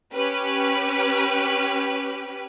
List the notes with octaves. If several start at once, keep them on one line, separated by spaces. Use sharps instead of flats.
C#4 G4 B4